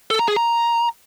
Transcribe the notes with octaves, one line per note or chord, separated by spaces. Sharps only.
A4
A#5
G#4
A#5